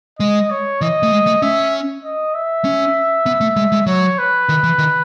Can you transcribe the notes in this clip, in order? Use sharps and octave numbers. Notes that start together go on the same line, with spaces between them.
G#3 D#5
C#5
E3 D#5
A3
G#3
A3
C#4 E5
D#5
E5
C#4
B3
A3
G#3
G#3
F#3 C#5
B4
D#3
E3
D#3